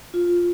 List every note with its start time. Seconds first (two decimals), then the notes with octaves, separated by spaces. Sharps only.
0.14 F4